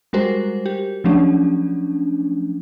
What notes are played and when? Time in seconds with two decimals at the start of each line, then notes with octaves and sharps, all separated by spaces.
0.13 G3 G#3 F#4 A#4 C5
0.66 G4
1.04 F3 F#3 A3 C#4 D4